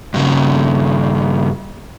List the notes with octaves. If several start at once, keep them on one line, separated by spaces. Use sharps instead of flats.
G2 C#3